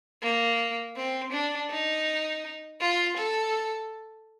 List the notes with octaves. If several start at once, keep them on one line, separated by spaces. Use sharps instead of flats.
A#3
C4
D4
D#4
F4
A4